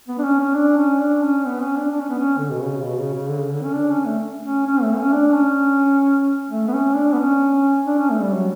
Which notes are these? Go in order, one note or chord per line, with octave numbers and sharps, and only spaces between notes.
B3
D4
C#4
C#4
D4
C#4
D4
C#4
B3
C#4
D4
D4
C#4
B3
C#4
D3
B2
C#3
B2
C#3
C#3
D3
C#3
D3
C#4
D4
C#4
A3
C#4
C#4
A3
C#4
D4
C#4
A3
B3
C#4
D4
B3
C#4
D4
C#4
A3
G3
F#3